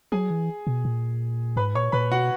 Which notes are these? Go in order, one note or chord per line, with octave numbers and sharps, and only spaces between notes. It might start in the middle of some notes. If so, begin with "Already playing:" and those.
F#3 G#4 G#5
E3
B2
A#2
G#2 B4 B5
A#2 C#5 C#6
A#2 B4 B5
B2 F#4 F#5